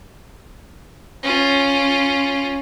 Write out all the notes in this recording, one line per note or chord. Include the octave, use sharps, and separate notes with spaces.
C#4 F4